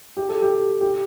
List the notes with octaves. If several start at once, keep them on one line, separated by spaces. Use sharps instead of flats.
G4
A4
G4
G4